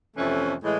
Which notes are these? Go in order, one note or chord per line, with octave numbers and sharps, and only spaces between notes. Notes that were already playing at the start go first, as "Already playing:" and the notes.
F2 C3 E3 A3 C#4
A2 E3 G#3